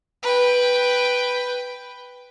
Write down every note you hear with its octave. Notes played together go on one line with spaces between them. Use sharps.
B4 G5